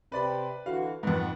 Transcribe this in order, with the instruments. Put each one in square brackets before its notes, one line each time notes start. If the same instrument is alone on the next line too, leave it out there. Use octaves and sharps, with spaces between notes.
[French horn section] C3 [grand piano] B4 D5 B5
[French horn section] D3 E3 F#4 [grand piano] F5
[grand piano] F2 G#2 [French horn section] D#3 B3